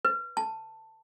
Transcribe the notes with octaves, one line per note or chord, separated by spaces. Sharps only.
B4
A5